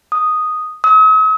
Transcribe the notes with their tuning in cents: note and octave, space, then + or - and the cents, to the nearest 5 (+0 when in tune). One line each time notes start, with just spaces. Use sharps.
D#6 -5
D#6 +45